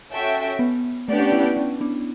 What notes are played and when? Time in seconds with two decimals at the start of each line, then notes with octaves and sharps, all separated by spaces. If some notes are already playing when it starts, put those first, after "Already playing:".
0.11 C#4 F#4 A4 E5 G5
0.59 B3
1.07 A3 B3 D4 G4 D5
1.20 C#4
1.32 C#4 E4
1.44 B3 D4
1.57 C#4
1.81 B3 D4